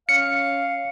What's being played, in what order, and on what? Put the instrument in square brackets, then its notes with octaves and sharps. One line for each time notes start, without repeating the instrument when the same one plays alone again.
[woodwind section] C#4 F5 [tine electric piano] C#7